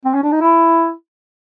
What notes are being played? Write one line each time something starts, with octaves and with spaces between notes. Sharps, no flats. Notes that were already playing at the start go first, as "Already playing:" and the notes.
C4
C#4
D4
D#4
E4